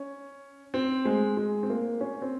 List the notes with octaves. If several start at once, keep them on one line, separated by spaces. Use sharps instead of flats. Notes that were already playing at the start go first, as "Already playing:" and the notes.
Already playing: C#4
C4
G#3
G#3
C4
A#3
C#4
C4